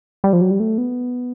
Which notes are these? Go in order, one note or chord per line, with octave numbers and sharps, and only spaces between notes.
G3
F3
F#3
G3
A3
B3